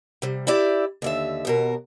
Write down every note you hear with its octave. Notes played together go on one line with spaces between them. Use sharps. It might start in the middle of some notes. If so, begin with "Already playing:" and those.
C3 G3
E4 G4 D5 E5
D#2 D3 E5
D#2 B2 A#4